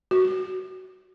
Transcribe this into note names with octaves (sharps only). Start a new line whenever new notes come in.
F#4